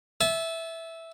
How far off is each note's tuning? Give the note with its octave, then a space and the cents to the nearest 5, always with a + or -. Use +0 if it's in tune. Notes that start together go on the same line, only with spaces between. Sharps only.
E5 -5 A5 -35